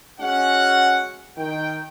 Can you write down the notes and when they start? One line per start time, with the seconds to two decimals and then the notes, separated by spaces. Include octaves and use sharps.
0.20 G#3 C#4 F#4 F#5
1.38 D#3 G5